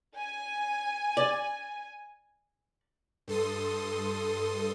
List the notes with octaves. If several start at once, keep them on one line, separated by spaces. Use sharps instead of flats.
G#5
D5
G2 A4 C6 D#6